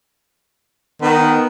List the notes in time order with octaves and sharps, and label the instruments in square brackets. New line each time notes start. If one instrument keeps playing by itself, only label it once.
[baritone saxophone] D#3 [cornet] B3